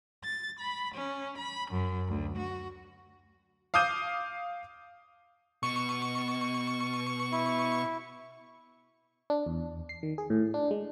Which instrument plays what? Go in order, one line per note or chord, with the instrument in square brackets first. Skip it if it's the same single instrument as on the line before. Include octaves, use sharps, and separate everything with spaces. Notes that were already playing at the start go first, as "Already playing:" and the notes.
[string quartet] A6
B5
C#4
B5
F#2
D2
F#4
[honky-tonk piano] F5 D6 D#6 G6 D#7
[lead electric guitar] B2 [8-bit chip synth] C#6
[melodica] E4
[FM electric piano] D4
E2
C7
D#3
G#4
A2
D4
G#3